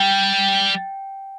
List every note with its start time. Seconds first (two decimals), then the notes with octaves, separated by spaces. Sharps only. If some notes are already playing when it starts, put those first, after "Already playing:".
Already playing: G3 G5